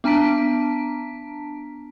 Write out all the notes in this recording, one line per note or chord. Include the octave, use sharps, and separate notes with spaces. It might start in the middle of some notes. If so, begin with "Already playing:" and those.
B3 D4 A5 A#5 B6 D7